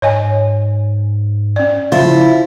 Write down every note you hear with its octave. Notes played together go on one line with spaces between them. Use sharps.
G#2 C#5 D#5 G#5
C#4 D5
C#3 F3 E4